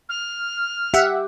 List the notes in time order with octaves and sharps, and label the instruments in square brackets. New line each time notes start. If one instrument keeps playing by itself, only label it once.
[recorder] F6
[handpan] G4 [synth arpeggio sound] E5 F#5